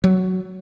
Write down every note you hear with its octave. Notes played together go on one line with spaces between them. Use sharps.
F#3